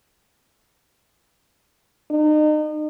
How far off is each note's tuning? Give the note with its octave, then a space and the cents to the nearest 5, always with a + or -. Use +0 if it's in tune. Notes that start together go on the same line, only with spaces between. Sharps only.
D#4 -35